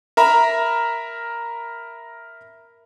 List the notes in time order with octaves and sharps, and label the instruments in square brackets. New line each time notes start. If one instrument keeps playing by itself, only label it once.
[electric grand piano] A#4 E5 A#5 B5